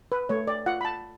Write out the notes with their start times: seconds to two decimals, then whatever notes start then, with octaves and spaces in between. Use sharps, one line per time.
0.12 B4
0.29 A3 C#5
0.47 D5
0.66 F4 F#5
0.81 B5
0.85 A5